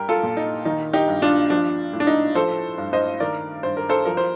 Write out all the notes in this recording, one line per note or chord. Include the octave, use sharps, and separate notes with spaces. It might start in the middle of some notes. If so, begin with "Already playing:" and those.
Already playing: G2 G3 G4 A#4
F4 A4
A#2
D#4
D#3 D#4
D#4 G4
G2
D4 F4
F3 D4
A2
D4
D#4
F3 A4 C5
G2
C5 D#5
D#3 A#4 D5
G2 C5
A#4
A4 C5
F3 A#4
C5